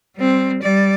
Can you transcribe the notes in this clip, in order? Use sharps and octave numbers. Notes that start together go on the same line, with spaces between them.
G3 C4
G3 D5